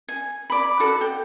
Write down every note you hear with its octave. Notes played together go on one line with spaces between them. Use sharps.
G#5
D5 B5
F#4 A4 F#5
G5